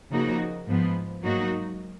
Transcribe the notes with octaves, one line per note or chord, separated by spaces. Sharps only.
C#3 F3 A#3 D#4 F#4
G#2 F3 B3
G#2 F#3 A#3 D#4 F#4